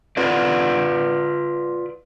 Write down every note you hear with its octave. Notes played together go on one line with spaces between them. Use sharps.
F4 B4 D5